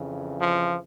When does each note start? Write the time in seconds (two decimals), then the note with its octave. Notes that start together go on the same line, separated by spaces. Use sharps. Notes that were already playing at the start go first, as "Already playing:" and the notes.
Already playing: F2 C#3 E3
0.40 F3